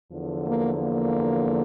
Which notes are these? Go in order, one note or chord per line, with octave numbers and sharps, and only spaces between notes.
E2 D3 F3
A#3
A#3